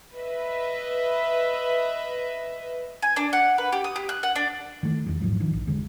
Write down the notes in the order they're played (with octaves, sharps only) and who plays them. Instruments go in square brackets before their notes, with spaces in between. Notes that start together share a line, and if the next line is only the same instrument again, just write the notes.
[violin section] B4 D#5 E5
[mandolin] G#5
D4
F#5
B4
G4
D#6
G4
F#6
F#5
D4
[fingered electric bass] D#3 E3 A3
E2 D#3 G3
A1 G#2 F3 F#3
D#3 F3 D4
A#1
E1 D3 G#3